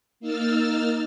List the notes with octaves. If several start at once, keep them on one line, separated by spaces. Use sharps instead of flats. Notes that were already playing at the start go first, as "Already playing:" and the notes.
A#3 D#4 E6 F6 A6